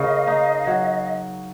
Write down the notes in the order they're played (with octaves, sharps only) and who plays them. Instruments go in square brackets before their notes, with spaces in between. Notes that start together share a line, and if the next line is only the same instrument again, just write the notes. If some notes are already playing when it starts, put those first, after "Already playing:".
Already playing: [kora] C#3 A#3 [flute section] D#5 F5
[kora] D#4
F#3